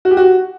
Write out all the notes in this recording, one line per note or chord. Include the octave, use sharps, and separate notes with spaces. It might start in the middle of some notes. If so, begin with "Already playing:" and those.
F#4
G4
F#4